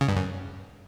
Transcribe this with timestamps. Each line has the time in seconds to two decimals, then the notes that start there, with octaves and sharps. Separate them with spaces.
0.01 C#3
0.08 G2
0.16 F#2